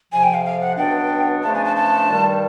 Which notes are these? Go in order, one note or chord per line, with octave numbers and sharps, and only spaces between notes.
F2 C3 F3 G#5
G5
F5
F5
F#5
C#2 B2 F#3 B3 D4 G5
E2 C#3 F3 A3 D4 A5
G#5
A5
A5
G2 D#3 G3